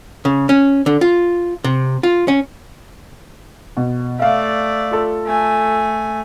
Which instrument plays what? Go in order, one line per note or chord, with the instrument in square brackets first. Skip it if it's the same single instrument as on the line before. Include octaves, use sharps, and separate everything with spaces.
[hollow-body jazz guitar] C#3
C#4
D3
F4
C3
F4
C#4
[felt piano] B2
[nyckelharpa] A3 D5 [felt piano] E5 F5
[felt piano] F4 A4
[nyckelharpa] A3 G#5